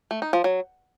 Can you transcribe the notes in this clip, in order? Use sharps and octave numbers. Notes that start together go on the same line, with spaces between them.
A3
D#4
F3
F#3